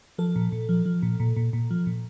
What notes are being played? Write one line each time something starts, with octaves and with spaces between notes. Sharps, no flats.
F3 A4
A#2
A#2
F3
F3
A#2
A#2
A#2
A#2
F3
A#2